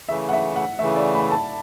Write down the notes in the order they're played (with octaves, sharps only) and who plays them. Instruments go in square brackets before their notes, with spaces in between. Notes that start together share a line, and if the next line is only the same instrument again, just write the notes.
[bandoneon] C#3 E3 A3 [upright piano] E5
[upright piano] F#5
E5
F#5
[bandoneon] C#3 E3 A3 [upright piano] E5
[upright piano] D5
B5
A5